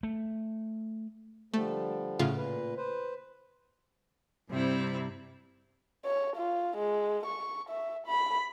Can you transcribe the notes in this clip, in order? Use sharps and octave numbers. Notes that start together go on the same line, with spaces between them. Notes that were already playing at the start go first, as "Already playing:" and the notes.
A3
D3 F3 G3 A3
A2 C#3 F4 F#5
A#2 B4
B4 C5
G2 C3 G3 C4 E4
C#5
F4
G#3
C#6
E5
B5